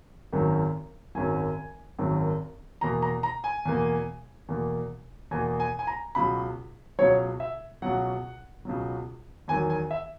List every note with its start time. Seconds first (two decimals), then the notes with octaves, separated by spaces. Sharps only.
0.33 G#1 F#2 D#3 F#3
1.15 G#1 F#2 D#3 F#3 G#5
1.99 G#1 F#2 D#3 F#3
2.81 E2 B2 A#3 A#5
3.02 A#5
3.23 A#5
3.44 G#5
3.65 E2 B2 A#3
4.49 E2 B2 A#3
5.31 E2 B2 A#3 G#5
5.60 G#5
5.79 G#5
5.87 A#5
6.15 C#2 B2 F#3 B5
6.99 C#2 B2 F#3 C#5
7.40 E5
7.82 C#2 B2 F#3 F#5
8.65 C#2 B2 F#3
9.48 E2 D#3 F#3 G#5
9.70 G#5
9.91 E5